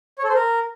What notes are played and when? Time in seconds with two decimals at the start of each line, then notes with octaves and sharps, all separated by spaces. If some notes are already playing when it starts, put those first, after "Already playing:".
0.18 C#5
0.24 A4
0.29 C5
0.35 A#4